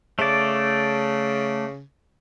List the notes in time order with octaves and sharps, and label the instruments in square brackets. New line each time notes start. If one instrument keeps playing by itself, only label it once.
[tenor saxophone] C#3 [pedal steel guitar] A3 D5